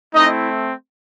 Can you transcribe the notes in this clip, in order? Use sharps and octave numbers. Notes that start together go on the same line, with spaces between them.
A3 C4 D#4 E4 D#5